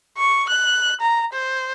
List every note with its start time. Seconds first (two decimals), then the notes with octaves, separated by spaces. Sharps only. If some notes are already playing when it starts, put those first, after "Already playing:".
0.18 C#6
0.49 F#6
1.01 A#5
1.33 C5